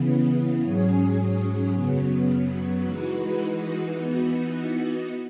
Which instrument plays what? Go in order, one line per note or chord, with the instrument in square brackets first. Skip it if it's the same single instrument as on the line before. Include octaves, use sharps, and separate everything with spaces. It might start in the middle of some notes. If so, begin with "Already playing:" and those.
Already playing: [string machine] C#3 E3 B3
G#2 F#3 C#4 G#4
F#2 C#3 F#3 B3
E3 G#3 D#4 F#4 B4
E3 B3 D#4 F#4